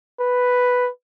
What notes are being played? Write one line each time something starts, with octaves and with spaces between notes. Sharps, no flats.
B4